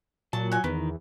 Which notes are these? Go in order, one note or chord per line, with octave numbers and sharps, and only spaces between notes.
A#2 F#3 A5
F#4 G#5
E2 D#3 B4